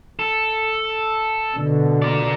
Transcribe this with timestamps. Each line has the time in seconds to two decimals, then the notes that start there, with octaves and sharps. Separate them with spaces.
0.19 A4
1.54 B2 D3
2.02 A#4 D5